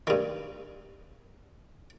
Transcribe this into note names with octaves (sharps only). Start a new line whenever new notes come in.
G2 D#3